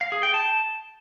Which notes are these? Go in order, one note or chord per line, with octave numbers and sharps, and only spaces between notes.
F5
G#4
G5
A5